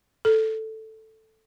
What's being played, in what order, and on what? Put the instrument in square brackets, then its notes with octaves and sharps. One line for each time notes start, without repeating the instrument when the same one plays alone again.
[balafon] A4